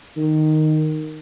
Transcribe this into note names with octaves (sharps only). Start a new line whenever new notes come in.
D#3